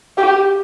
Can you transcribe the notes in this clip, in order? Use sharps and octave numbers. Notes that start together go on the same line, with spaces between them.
G4